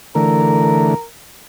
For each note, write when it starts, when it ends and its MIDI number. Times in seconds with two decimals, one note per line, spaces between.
0.15 0.94 50
0.15 0.94 52
0.15 0.94 57
0.15 1.07 70